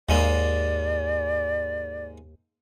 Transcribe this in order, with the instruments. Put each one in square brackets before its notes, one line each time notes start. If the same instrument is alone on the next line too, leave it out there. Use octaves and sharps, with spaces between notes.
[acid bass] D#2 [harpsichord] G#2 G#3 A#3 [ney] D5